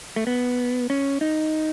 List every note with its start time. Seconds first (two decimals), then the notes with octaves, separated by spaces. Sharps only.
0.16 A3
0.27 B3
0.90 C#4
1.21 D#4